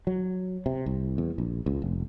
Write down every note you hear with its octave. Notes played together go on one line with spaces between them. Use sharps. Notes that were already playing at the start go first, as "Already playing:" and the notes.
F#3
C3
C2
E2
A#1
C#2
F1